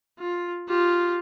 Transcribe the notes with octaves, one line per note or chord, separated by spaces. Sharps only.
F4
F4 G4